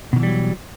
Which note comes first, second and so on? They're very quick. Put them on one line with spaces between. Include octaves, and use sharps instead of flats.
B2 D#3 E3 G3 F#3